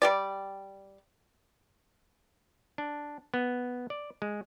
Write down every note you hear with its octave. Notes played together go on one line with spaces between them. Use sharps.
G3 G4 D5
D4
B3
D5
G#3